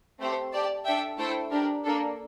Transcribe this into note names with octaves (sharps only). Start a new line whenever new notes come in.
A3 C4 G4 C5
G4 D5 A5
D4 A4 E5 G5
A3 E4 A4 C5 G5
D4 G4 A#4
A#3 D4 A4